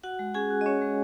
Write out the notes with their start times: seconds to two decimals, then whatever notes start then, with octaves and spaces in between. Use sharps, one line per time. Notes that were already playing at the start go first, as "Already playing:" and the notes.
0.03 F#4 F#5
0.19 G#3
0.34 C#4 G#4 G#5
0.51 F#4
0.61 D#5
0.66 C#4 C#5
0.82 G#3